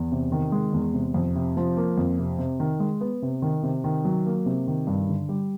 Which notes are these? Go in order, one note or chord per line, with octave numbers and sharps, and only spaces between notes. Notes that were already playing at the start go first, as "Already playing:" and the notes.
Already playing: E2
C3
D#3
G#3
E2
C3
F2
C3
F3
A#3
F2
C3
C3
D#3
G#3
B3
C3
D#3
C3
D#3
F#3
A#3
C3
D#3
G2
D3
G3